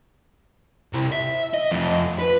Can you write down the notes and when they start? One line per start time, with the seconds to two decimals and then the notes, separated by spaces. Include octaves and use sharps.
0.93 C3 E4
1.12 E5
1.54 D#5
1.71 F2 A3
2.19 B4